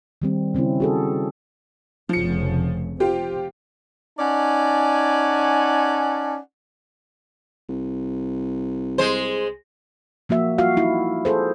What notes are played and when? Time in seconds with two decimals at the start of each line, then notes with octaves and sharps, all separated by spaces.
0.22 D#3 G3 C4
0.55 C#3 C4 C#4 E4
0.80 F#4 G#4 A4
2.09 F1 C#3 F3 C#7
3.00 C4 F4 G4
4.19 C#4 D#4 D5 F#5 G#5 A5
7.69 C2
8.98 G#3 C5
10.29 F3 A#3 F#4 E5
10.58 G3 F4 F#4 F5
10.77 D#4 E4
11.25 G#4 A4 C5